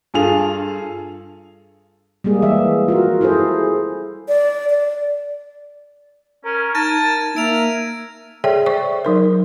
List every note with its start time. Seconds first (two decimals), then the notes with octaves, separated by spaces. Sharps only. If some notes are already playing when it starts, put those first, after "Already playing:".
0.14 G2 F4 G#4 A4 F7
2.24 G3 G#3 A#3 G#4
2.42 E3 E5
2.88 F4 F#4 A#4
3.21 E4 G#4 A4 C5
4.28 D5
4.70 D5
6.45 C#4 A#4
6.75 D#4 A5 G#6 A#6 D#7
7.36 A#3 A#4 E5 D7 F7
8.44 G#4 A4 C#5 D5 E5 G5
8.66 C5 D5 E5 C#6
9.05 F#3 D#4 A#4